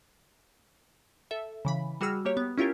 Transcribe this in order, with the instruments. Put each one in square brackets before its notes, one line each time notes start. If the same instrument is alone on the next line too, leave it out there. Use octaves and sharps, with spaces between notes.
[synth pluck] A4 E5
C#3 E3 B5
G3 F#4 G#4 E6 F6
A#3 G4 C#5
B3
C#4 E4 F4 G4 A#4